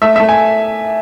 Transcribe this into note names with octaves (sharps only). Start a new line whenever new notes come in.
A3 E5
A3 E5
G#5